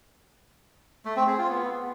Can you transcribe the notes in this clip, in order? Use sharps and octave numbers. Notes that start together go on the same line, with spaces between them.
A3
C4
G#4
F4
B3